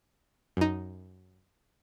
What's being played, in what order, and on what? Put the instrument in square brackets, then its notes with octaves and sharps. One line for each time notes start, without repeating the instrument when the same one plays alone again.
[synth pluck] F#2 D#4